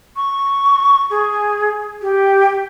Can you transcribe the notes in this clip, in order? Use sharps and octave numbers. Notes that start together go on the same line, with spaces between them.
C#6
G#4
G4